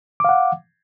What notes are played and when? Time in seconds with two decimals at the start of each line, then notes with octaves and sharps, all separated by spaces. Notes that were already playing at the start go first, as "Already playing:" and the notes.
0.20 D6
0.25 F5
0.29 F#5